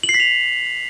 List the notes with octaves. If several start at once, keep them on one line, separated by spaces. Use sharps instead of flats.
F#7
C7
B6
F7